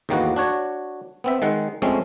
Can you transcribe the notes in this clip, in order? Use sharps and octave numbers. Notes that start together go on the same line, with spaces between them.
E2 A2 D#3 A#3 B3 F#4
D4 F#4 C#5
B3 C4 E5
D#3 G#3 F#5
F2 G#3 A3 C4 C#4